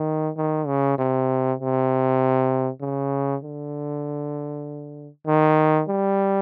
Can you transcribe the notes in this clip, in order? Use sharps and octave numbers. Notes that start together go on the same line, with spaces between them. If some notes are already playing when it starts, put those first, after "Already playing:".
Already playing: D#3
D#3
C#3
C3
C3
C#3
D3
D#3
G3